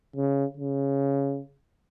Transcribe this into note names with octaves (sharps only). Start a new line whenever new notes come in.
C#3
C#3